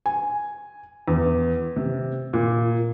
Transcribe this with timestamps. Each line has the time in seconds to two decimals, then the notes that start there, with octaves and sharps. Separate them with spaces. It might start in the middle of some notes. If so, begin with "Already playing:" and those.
0.06 G#5
1.08 E2
1.76 C3
2.33 A#2